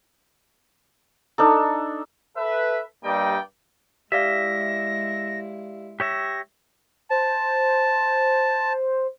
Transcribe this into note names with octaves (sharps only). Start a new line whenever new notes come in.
D4 D#4 A4
A4 B4 E5
G2 G3 A#3 D5 D#5 G5
G#3 E4 G4 D5 E5 F5 A#6
G4 C#5 E5 A#6
C5 A5